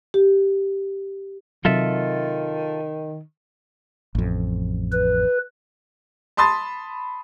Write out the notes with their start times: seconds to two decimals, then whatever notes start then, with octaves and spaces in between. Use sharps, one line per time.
0.14 G4
1.65 C3 D#3 F#3 F4 A4 E5
4.15 A1 F2
4.92 B4
6.37 A5 B5 C6 D#6 A6